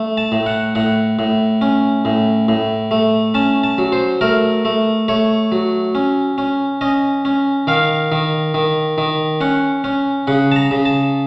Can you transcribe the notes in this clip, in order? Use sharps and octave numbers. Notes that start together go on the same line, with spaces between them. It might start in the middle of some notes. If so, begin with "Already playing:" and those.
Already playing: A3
A5
A2
F#5
A2 F#5
A2
C#4
A2
A2
A3
C#4 A5
A5
F#3
C5
A3 A#4
A3
A3 C#5
F#3
C#4
C#4
C#4 D#5
C#4
D#3 F5
D#3
D#3
D#3
C#4 F#5
C#4
C#3 F#5
A5
A#5
C#3
A5